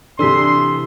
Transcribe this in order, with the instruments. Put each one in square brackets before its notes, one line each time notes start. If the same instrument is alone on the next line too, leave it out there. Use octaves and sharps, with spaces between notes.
[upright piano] C3 E3 [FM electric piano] D4 [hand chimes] A4 E6 B6 [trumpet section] C6